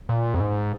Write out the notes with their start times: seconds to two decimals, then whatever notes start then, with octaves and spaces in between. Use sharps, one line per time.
0.09 A#2
0.34 F2
0.40 G#2